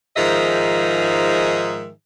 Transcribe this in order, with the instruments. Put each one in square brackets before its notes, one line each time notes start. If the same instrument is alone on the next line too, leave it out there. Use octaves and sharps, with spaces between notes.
[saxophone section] G#2 D#3 F3 G#4 D#5 E5